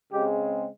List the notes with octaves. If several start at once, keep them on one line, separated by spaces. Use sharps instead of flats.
C#3 G#3 C4 G4